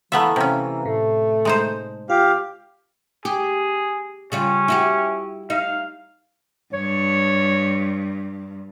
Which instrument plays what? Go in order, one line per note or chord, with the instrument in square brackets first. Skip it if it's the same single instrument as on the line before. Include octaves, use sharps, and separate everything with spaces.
[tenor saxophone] E3 [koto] A3 B3 E5 [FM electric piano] F5 A#5
[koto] C3 C#4
[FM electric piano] A2 [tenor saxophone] A3
[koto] G#3 D#4 C5
[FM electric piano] F4 [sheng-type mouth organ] G4 F5
[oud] G4 [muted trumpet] G#4
[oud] C#3 G3 F4 [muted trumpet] C#4
[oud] E4 F#4 G4
[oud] D#4 [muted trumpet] F5
[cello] G2 [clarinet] C#5